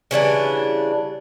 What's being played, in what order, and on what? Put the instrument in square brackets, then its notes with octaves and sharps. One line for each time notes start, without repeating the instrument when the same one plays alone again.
[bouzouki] C#3 E3 G3 D4